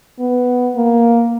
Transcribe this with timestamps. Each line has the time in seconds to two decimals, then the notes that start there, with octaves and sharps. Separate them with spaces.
0.19 B3
0.76 A#3